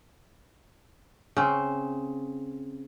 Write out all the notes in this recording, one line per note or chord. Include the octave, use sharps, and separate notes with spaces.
C#3 C4